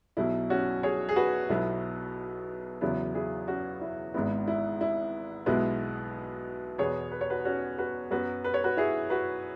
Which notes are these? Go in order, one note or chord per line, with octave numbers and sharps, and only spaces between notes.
B1 B2 F#3 E4
C#4 F#4
G#4 C#5
G#4
F#4 B4
B1 B2 F#3 B3 E4
E2 C#3 F#3 B3 E4
E4 G#4
C#4 F#4
E4
G#1 G#2 G#3 B3 E4
E4
E4
B1 B2 G#3 B3 E4
E2 B2 B3 G#4 C#5
B4
C#5
F#4 B4
C#4 F#4
F#4 B4
F#2 F#3 B3 F#4 B4
B4
C#5
F#4 B4
E4 G#4
F#4 B4